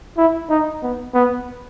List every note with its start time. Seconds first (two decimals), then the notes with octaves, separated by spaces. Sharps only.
0.17 E4
0.49 D#4
0.82 B3
1.15 B3